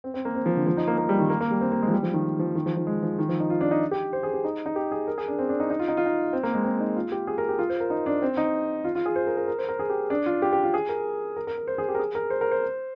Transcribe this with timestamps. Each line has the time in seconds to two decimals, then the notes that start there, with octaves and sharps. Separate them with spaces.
0.04 C4
0.14 C4
0.25 A#3
0.35 C4
0.46 F3
0.57 D3
0.67 F3
0.77 D#4
0.88 A#3
0.98 A#3
1.09 G3
1.19 D#3
1.30 A#3
1.41 A#3
1.51 G3
1.61 C4
1.72 A#3
1.82 G#3
1.88 F3
1.93 G3
2.03 F3
2.14 D#3
2.39 F3
2.55 D#3
2.66 F3
2.76 F3
2.87 G#3
3.03 F3
3.19 D#3
3.29 F3
3.40 D#4
3.50 F4
3.61 D4
3.71 D#4
3.91 G4
4.13 C5
4.23 G#4
4.34 G4
4.44 D#4
4.66 D#4
4.76 G4
4.92 G#4
5.07 A#4
5.18 G#4
5.28 D4
5.39 C4
5.49 D4
5.60 D#4
5.70 D#4
5.79 F4
5.88 D#4
5.97 F4
6.06 D#4
6.33 C4
6.43 A#3
6.54 G#3
6.64 C4
6.80 D#4
6.96 F4
7.12 G4
7.27 G#4
7.38 A#4
7.49 G4
7.59 F4
7.70 C5
7.80 A#4
7.90 D#4
8.06 D4
8.22 C4
8.37 D#4
8.84 F4
8.95 F4
9.06 G#4
9.16 C5
9.27 A#4
9.37 A#4
9.48 A#4
9.59 C5
9.69 A#4
9.79 G#4
9.90 G4
10.10 D4
10.26 F4
10.42 G4
10.53 G4
10.63 F4
10.74 G#4
10.89 A#4
11.36 A#4
11.47 A#4
11.57 A#4
11.68 C5
11.78 G#4
11.89 G4
11.95 A#4
11.99 G#4
12.15 A#4
12.30 C5
12.41 A#4
12.51 C5